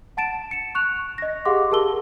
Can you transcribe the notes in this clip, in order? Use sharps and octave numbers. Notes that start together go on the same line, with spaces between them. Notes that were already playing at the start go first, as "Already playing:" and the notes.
F#5 A5 A6 D7 E7
C#7 E7
C#6 F#6 F7
D#5 A#6
G4 G#4 F5 F#5 C6 D6
G4 G#4 A#4 A5 E6 G7